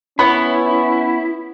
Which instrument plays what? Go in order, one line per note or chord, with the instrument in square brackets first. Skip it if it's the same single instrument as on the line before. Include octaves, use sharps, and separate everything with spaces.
[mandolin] B3 C#5 [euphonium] C#4 [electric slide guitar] E4 [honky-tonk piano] B5